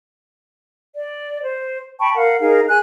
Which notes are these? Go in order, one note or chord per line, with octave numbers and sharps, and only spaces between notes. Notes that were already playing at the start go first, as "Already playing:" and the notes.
D5
C5
G5 A5 B5 C#6
A#4 F5 F#5
D#4 G#4 A#4 F5
G#4 G#5 F#6